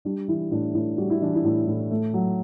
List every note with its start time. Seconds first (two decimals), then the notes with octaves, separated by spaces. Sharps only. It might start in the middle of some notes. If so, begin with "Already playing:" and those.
0.05 G3 D4
0.28 E3 E4
0.51 A2 D4
0.74 A2 D4
0.98 G3 F#4
1.10 E4
1.21 E3 D4
1.34 E4
1.44 A2
1.67 A2
1.91 A3
2.14 F#3